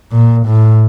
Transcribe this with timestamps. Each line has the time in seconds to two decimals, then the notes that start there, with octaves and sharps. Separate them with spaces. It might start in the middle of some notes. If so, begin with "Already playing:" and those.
0.11 A#2
0.46 A2